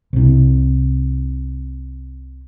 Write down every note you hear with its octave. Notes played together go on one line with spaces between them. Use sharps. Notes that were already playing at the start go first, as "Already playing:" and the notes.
C2 C3